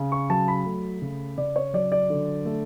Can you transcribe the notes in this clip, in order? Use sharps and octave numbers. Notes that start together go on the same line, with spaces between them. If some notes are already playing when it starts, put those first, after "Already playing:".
Already playing: C#3
C#6
F#3 A5
B5
A3
C#3
C#3 D5
C#5
F#3 D5
D5
D3
A3